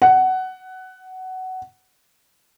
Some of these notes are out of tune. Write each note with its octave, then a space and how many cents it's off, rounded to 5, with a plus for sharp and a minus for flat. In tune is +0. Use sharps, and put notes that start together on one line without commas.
F#5 +15